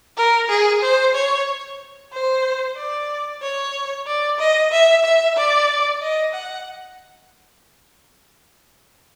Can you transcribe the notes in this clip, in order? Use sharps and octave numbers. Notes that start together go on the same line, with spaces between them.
A#4
G#4
C5
C#5
C5
D5
C#5
D5
D#5
E5
E5
D5
D#5
F#5